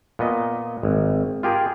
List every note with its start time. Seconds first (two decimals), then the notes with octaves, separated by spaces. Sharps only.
0.19 A#2 B3 D#5
0.83 G#1
1.43 F4 G4 G#4 A#4